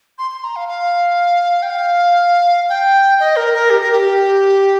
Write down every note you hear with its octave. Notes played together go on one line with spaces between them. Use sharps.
C6
C6
A#5
F5
F5
G5
F5
G5
D#5
A#4
A#4
G4
A#4
G4